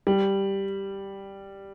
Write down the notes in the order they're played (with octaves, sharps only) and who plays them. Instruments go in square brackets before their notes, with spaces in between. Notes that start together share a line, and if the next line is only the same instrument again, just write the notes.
[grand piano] G3